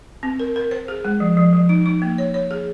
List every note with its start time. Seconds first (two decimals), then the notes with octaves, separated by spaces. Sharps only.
0.23 C4
0.40 A#4
0.56 A#4
0.71 C5
0.88 G#4
1.05 G#3
1.20 F3
1.37 F3
1.53 F3
1.69 D#4
1.86 D#4
2.02 A#3
2.18 C#5
2.34 C#5
2.51 G#4